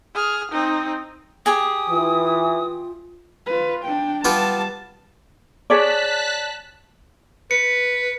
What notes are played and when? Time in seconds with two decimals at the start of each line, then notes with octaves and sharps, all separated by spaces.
0.15 G#4 F6
0.52 C4 D#4
1.46 G4 G#4 G#5 D#6
1.90 E3 F4
3.47 F4 B4
3.85 D4 G5
4.25 G3 B3 F4 G4 A5
5.70 G#4 C#5 D5 A5 F#6 B6
7.51 B4 C#7